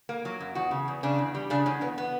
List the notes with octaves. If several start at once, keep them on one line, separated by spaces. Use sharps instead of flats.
A#3
F#3
F#2
E2 F#4
C#3
E2
C#3 D4
E2
G3
C#3 D4
E2 C#4
E2 B3
B3